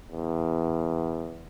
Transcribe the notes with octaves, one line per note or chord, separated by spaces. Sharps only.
E2